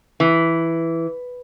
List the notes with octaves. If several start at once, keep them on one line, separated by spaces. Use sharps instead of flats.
E3